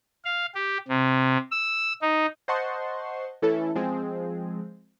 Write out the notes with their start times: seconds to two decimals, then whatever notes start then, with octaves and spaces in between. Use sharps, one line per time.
0.25 F5
0.55 G4
0.88 C3
1.51 E6
2.02 D#4
2.48 C5 D#5 F#5 A5 C6 C#6
3.42 E3 A3 C#4 E4 A4
3.75 F3 G#3 C4 G#4